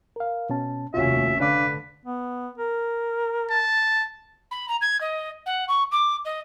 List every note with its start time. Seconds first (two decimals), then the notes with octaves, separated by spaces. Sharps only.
0.16 A#4 F5
0.50 B2 C#4 A5
0.94 F1 D#2 C#4 F4 F#4 E5
1.40 D3 D4 B4 F5 D6
2.06 B3
2.58 A#4
3.50 A5
4.51 B5
4.68 A#5
4.81 G#6
5.00 D#5
5.46 F#5
5.68 C#6
5.91 D6
6.25 D#5